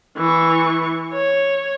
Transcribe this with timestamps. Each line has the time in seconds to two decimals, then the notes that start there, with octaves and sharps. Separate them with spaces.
0.17 E3 C#6
1.13 C#5